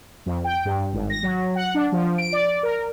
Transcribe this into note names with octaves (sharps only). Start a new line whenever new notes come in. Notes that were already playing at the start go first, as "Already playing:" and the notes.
F2
G5
G2
G#1
A#6
F#3
F#5
D4
F3
D7
D5
A#4